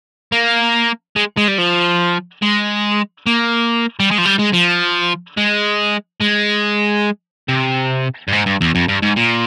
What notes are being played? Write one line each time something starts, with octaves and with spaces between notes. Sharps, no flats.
A#3
G#3
G#3
G3
F3
G#3
A#3
G3
G#3
F3
G3
G#3
F3
G#3
G#3
C3
G2
G#2
G2
E2
F2
G2
G#2
A#2